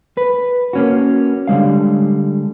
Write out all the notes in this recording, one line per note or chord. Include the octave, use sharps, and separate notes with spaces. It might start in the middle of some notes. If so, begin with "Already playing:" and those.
B4
A#3 C#4 F#4
D3 G3 G#3 F5